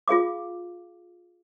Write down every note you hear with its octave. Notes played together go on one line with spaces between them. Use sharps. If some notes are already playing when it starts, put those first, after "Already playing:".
F4 G#4 F5 D6